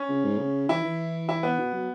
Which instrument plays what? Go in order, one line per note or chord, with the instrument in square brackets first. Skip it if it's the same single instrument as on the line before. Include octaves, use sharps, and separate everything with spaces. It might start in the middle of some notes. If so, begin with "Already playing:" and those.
Already playing: [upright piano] C#4
[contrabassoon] C#3
G#2
C#3
[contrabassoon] E3 [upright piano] E4
[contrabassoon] E3
[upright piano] E4
B3
[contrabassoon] B2
F#3